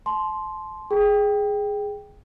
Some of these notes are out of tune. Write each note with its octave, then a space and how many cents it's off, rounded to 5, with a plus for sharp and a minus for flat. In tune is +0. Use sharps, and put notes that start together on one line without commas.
A5 -30 C6 +0
G#4 +0 G5 +0